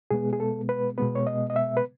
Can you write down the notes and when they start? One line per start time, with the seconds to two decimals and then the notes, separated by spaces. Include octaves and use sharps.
0.11 B2 G#3 B3 G#4
0.33 G#4
0.40 A4
0.69 B4
0.98 B2 G#3 B3 B4
1.15 C#5
1.27 D#5
1.50 D#5
1.56 E5
1.77 B4